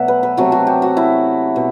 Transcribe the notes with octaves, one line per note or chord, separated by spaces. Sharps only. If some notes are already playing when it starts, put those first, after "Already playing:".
Already playing: B2 F#3 A3 D5 E5 F#5
B4
B4
C3 F#3 A3 F#4
F#4
G4
F#4
E4
B2